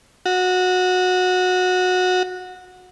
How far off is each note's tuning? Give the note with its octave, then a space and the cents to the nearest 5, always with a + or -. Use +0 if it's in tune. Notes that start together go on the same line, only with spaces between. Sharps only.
F#4 -20